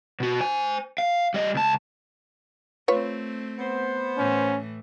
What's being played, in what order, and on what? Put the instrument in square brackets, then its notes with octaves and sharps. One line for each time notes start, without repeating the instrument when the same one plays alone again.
[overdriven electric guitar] B2 F#4
C5 G#5
F5
G3 D#5
C#2 A5
[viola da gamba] A3 C4 [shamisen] F4 B4 C#5
[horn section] B3 C5
[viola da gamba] A2 E3 [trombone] C#4